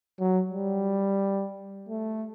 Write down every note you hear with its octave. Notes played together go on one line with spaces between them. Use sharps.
F#3
G3
A3